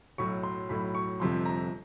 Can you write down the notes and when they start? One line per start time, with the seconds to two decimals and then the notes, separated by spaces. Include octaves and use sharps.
0.18 B1 A2 F#3 C#6
0.43 C6
0.69 B1 A2 F#3 B5
0.95 C#6
1.20 G1 F2 C3 C6
1.45 A#5